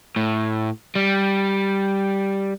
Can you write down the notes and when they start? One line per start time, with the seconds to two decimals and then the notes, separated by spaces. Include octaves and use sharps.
0.16 A2
0.95 G3